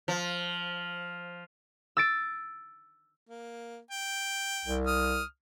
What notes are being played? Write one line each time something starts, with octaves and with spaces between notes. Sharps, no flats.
F3
E6 A6 D7
A#3
G5
C2
D#6 F6